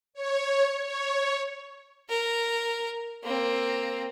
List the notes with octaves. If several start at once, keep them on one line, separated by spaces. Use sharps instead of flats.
C#5
C#5
A#4
A#3 C4